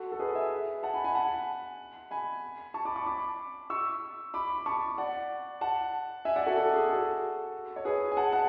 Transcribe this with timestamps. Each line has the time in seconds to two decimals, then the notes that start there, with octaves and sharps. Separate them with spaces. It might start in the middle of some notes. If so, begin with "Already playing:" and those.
Already playing: F#4 A4
0.12 A4
0.19 G#4 B4
0.35 E5 G#5
0.83 F#5 A5
0.94 G#5 B5
1.04 G#5 B5
1.15 F#5 A5
2.11 G#5 B5
2.74 A5 C#6
2.85 B5 D6
2.96 A5 C#6
3.06 B5 D6
3.70 C#6 E6
4.34 B5 D6
4.58 B5
4.66 A5 C#6
4.98 D5 F#5
5.61 F#5 A5
6.25 E5 G#5
6.36 D5 F#5
6.46 F#4 A4
6.57 F#4 A4
6.74 G#4
6.89 F#4 A4
7.76 C#5
7.85 G#4 B4
8.12 G#5
8.17 F#5 A5
8.32 F#5 A5